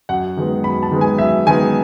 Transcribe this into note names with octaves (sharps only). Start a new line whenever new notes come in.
F#2 F#5
D#3 G#3 B3
F#2 B5
A5
D#3 G#3 B3
G#5
F#2 E5
D#3 G#3 B3 G#5